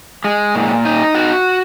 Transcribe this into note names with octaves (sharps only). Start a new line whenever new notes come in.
G#3
A#2
D#4
F#4